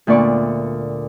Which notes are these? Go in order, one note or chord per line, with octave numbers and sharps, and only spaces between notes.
D2 A#2 B3 D5 C#6